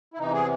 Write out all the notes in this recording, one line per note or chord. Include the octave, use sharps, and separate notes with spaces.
E4
E2 C3 E3 D#4
G#4